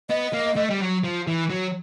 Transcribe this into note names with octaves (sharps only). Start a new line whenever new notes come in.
B3 D#5
A#3
A3
G3
F#3
F3
E3
F#3